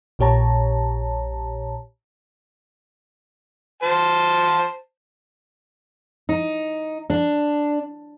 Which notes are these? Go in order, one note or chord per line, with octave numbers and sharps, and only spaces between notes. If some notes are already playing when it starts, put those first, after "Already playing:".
A#1 A#2 G4 C#5 A5 A#5
C5 A5
D#4
D4